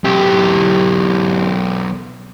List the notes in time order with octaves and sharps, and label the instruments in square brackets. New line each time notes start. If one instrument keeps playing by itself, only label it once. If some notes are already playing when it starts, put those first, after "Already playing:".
[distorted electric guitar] B1 G4